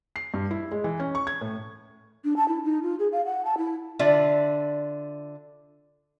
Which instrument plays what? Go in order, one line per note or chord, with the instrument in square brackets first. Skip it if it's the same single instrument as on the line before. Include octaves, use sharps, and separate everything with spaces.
[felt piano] C7
G2
E4
G#3
E3
C#4
C#6
G#6
A2
[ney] D4
A5
E4
D#4
F4
G#4
F5
F#5
A5
E4
[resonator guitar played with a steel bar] D3 D4 F4 D5 E5